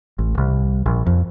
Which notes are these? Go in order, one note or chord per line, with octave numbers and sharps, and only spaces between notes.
A1
C2
A#1
F2